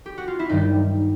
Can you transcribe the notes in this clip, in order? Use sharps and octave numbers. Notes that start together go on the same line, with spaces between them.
G4
F#4
F4
E4
G2 D#3 G3 D#4